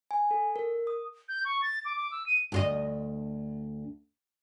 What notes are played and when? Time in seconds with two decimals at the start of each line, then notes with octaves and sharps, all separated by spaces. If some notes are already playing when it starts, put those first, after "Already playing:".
0.11 G#5
0.31 A4
0.56 A#4
0.87 D#6
1.28 G6
1.45 C#6
1.62 A6
1.85 D6
1.96 D6
2.11 E6
2.26 D#7
2.52 D2 F4 D#5